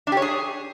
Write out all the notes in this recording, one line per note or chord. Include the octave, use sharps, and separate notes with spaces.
D4
G4
C#5
G#4